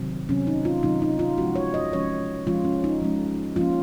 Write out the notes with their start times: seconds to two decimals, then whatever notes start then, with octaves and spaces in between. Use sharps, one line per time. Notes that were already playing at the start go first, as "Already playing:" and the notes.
Already playing: C3 D#3 F#3 C4
0.29 C3 D#3 F#3 C4 C#4
0.47 D#4
0.65 F4
0.83 C3 D#3 F#3 C4 D#4
1.02 D#4
1.19 F4
1.38 F3 G#3 C#4 F#4
1.56 C#5
1.74 D#5
1.92 F3 G#3 C#4 C#5
2.47 F3 G#3 C#4 F4
2.65 C#4
2.84 D#4
3.01 F3 G#3 C#4
3.56 F3 A#3 C#4 F4